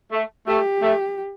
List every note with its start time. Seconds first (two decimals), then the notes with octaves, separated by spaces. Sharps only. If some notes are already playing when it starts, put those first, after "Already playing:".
0.12 A3
0.48 A3 G4
0.82 A3